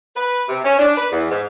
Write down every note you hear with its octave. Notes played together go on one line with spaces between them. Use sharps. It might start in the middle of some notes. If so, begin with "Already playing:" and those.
B4
C3
C#4
D4
B4
E2
G#2